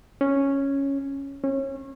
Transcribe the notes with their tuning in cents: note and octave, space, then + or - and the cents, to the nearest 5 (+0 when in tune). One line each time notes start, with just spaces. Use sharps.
C#4 -5
C#4 -30